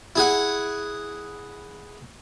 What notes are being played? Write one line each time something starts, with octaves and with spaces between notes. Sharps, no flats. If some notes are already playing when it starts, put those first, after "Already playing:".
E4 G#4 F#5